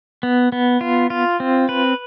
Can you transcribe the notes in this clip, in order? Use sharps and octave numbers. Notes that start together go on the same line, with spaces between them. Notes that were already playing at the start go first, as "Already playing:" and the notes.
B3
B3
F4
F4
C4
B4